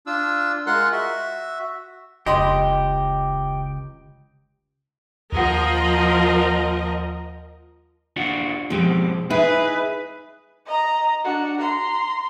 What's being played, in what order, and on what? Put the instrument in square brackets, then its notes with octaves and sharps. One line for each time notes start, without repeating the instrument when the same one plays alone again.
[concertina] D4 F4 E6
G#3 F4 A#4 F#5 C6 F#6
F#4 E5
[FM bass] F1 [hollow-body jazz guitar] C#2 B5 C6 [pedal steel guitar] G4 [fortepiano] D#5
[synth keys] D#2 F#5 [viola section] F3 A#4 D#5
[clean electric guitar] D4 F4 F#4
[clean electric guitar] B2 G#3 C4 [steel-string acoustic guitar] F3 G4
[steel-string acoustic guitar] D#4 [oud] E4 [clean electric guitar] G#4 [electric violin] B4
[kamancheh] D#5 A#5
D4 F#4
A#5 C6